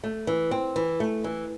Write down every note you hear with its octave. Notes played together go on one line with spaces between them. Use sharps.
A3
E3
C4
E3
A3
E3